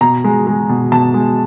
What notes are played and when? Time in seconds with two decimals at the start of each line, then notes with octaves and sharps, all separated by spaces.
0.01 B2 A#5
0.24 G#3
0.47 G#3
0.69 B2
0.92 B2 A5
1.14 G#3